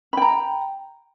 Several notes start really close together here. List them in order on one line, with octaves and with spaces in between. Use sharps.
B5 G5 A#5